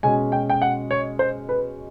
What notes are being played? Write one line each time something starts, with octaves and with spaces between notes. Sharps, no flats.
B2 G#3 C#4 G#5
G5
G5
F#5
C#5
C5
B4